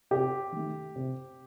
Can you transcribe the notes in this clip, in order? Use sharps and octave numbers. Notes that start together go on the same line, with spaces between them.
C3 G4
D#3 A3
C3